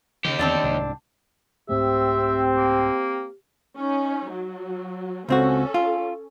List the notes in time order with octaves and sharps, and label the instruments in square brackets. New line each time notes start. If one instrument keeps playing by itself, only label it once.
[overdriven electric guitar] D#2 G4 [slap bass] C#3 E3
[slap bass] E2 D3 [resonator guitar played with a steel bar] C4 D4 D5
[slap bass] C2 G#2
[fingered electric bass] C2 G#2 A3 [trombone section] C4 [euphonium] G4 [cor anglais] E5
[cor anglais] A#3
[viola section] C#4 D#4
F#3
[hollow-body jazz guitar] C#2 C4 F#4 [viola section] C#4 A4
[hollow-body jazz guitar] F4